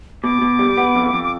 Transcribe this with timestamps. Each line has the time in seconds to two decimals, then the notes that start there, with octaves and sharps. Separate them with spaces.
0.23 B2 D6
0.42 B2
0.59 G3
0.77 B3
0.95 F2
1.13 F2
1.24 D6